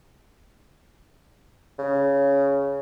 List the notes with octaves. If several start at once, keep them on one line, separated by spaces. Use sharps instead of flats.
C#3